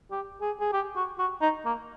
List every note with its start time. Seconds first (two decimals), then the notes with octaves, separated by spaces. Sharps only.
0.11 G4
0.42 G#4
0.61 G#4
0.73 G4
0.96 F#4
1.19 F#4
1.42 D#4
1.65 A#3